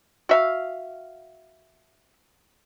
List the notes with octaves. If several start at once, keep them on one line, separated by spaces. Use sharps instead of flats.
F#4 E5 F5